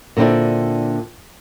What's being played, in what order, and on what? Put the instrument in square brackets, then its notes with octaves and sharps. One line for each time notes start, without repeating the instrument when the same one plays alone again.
[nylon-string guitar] A#2 D3 C4 D4 E4